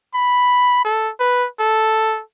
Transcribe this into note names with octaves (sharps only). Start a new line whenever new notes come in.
B5
A4
B4
A4